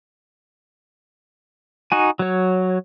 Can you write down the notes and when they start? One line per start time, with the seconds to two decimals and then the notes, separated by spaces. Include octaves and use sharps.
1.92 D#4 F#4 G#5
2.19 F#3 C#5